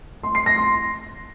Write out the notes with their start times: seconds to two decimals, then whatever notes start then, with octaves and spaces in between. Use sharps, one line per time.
0.23 C6
0.35 C7
0.46 A#6
0.58 C6